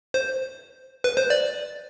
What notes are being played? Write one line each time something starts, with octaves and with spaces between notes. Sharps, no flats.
C5
B4
C5
D5